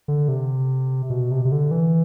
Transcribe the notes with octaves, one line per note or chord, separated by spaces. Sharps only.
D3
C3
B2
C3
C3
D3
E3